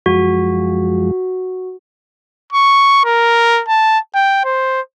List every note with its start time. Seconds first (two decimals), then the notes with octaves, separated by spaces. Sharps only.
0.06 F#2 F3 G#3 F#4
2.53 C#6
3.05 A#4
3.69 A5
4.15 G5
4.45 C5